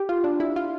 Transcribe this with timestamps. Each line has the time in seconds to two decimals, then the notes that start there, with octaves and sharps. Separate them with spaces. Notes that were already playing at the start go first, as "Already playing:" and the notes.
Already playing: G4
0.09 F4
0.24 D4
0.40 E4
0.56 F4